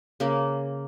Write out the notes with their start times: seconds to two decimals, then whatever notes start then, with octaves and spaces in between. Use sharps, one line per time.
0.20 C#3 A#3